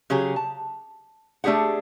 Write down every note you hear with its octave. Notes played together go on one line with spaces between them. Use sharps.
C#3 F#3 G4 G#4
A5
A3 D4 G4 G#4 F#5